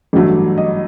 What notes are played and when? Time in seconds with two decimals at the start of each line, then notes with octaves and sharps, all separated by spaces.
0.13 A1 G2 F#3 A3
0.58 D#5